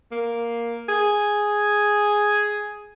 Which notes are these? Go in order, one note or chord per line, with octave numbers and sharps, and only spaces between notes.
A#3
G#4